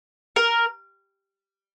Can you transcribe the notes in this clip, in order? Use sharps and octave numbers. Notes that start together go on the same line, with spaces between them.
A#4